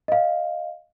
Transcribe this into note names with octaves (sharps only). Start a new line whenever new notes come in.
D#5 F5